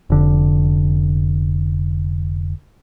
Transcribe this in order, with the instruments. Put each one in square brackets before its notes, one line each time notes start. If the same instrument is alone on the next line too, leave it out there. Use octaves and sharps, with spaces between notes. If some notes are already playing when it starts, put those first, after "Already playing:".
[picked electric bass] F1 D3